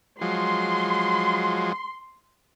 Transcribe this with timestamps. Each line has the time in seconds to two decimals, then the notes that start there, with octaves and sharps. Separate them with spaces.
0.21 F3 F#3 G#3 C6